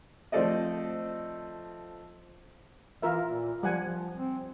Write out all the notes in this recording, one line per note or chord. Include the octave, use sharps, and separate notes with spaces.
F3 A3 C4 A4 D5 D#5
E3 F4 A#4 E5
A#2
F3 G3 F#5 G#5
F3
C4